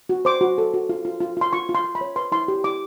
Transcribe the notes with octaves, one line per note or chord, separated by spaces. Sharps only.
F#4
C5 D6
F#4
A4
F#4
F4
F4
F4
F4 C6
F4 C#6
F4
C6
F4
B5
C#5
B4 C6
E4 C6
G4
E4 D6